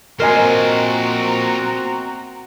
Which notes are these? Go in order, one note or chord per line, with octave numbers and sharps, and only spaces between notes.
A#2 C4 F#4 A#4 C5 D#5 G#5 A#5